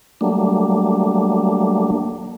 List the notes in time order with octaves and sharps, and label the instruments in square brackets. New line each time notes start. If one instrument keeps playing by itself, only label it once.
[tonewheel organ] F#3 G3 A3 A#3 D4